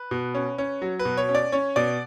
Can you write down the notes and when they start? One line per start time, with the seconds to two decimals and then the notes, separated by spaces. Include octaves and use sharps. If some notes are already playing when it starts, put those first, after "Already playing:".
Already playing: B4
0.11 B2
0.35 C#4
0.58 C#4
0.82 F#3
0.99 B4
1.05 B2
1.17 C#5
1.29 C#4
1.35 D5
1.52 C#4 C#5
1.76 B2 D5